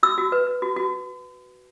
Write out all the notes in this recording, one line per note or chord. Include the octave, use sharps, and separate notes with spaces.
F#4 E6
F#4
B4
B4
F#4
F#4